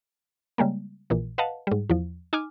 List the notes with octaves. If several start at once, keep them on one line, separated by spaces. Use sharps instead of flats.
C#3 G3 G#3 A#3
A#1 A#2 E3
B4 D#5 F5 F#5 A5
G#2 G3
E2 F3
D#4 G#5 D6 F6